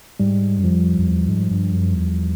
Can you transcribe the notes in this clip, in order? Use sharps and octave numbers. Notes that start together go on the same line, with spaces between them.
G#2 G3
F#2
F2 F3
F2
E2
G#2
G2
F#2
E2